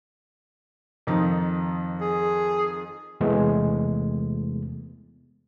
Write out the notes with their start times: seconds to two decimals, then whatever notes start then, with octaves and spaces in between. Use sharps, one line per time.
1.07 F2 D#3 D#4
2.01 G#4
3.20 E2 C3 E3 G#3 A3 B3